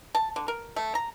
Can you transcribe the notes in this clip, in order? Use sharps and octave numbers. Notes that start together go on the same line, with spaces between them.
A5
D3
A#4
A3
A#5